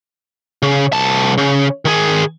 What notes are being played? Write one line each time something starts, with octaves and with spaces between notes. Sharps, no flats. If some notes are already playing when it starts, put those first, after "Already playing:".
C#3
C2 A5
C#3
D#3 G#4